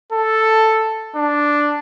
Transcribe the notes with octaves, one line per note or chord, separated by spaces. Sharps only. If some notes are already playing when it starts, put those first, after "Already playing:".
A4
D4